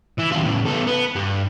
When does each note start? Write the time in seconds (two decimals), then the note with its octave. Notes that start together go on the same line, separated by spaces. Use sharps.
0.19 E3
0.32 D#2 F4
0.45 A2 C#3
0.66 B3 A4
0.87 B3
1.15 G2